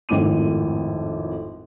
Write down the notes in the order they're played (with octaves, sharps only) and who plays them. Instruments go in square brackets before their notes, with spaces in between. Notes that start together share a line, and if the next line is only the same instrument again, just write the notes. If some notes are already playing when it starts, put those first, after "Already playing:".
[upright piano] G#1 F2 A2 D6 D#7